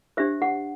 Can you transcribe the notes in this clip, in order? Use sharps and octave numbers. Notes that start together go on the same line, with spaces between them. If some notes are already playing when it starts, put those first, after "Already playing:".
D4 G4 C5 E5
F#5